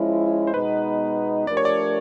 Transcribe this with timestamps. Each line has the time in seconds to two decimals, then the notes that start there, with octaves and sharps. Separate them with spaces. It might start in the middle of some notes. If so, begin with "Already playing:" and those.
Already playing: F3 G#3 C#4 E4 A#4
0.47 C5
0.54 B2 G#3 B3 D#4 B4
1.47 F3 A3 D4 G4 A#4 D5
1.57 C#5
1.65 D5